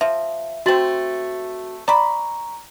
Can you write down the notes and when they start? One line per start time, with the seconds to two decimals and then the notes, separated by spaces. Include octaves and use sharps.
0.01 F3 E5
0.66 A3 C4 F#4 A6 F#7
1.88 D5 A#5 B5 C#6